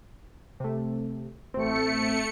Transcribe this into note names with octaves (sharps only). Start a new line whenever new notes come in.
C3 A3
A1 A3 C4 C#7